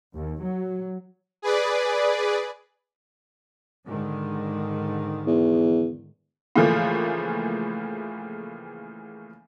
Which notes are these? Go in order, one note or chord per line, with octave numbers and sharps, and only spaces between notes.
D#2
F#3
G#4 B4 D5
G#2 D3 D#3
E2
A2 C#3 E3 F3 A3 A#3